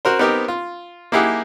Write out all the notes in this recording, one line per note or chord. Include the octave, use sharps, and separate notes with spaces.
F#4 A#4 C5
B3 C4 D#4 G4 A#4
F4
A#3 D#4 E4 G4 G#4 F#5